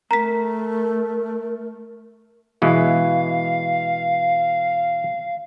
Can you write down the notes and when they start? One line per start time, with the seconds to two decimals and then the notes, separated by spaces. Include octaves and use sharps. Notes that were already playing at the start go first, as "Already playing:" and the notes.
0.11 A3 A#4 A#5 B6
2.62 B2 E3 G#3 F5